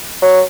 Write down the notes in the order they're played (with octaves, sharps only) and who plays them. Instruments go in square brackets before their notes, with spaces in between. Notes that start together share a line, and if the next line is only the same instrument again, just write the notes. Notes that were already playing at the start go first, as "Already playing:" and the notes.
[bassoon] F#3